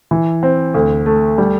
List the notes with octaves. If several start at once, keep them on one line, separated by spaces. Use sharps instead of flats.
E3
C4
D2
A3
G3